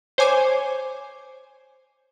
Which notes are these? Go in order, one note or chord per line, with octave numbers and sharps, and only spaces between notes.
C5 C#5 G#5 D6